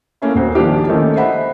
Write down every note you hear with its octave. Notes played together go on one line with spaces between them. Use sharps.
A3 A#3 C#4 E4
D#1 F#4 C5
D#3 F3 A#3 D4 G4
D#3 A3 A#3 C#4 D#4 E4
C5 D#5 E5 F#5 B5